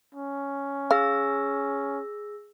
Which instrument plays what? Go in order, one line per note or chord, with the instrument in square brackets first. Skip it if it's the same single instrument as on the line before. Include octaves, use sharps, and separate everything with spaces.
[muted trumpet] C#4
[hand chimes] G#4 E6 A#6 [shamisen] F5